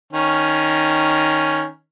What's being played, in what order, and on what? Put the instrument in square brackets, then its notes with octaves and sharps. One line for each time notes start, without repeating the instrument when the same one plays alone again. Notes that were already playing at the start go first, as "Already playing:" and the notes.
[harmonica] D#3 C#4